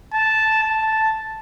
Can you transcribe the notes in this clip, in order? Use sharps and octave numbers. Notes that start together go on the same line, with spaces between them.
A5
A5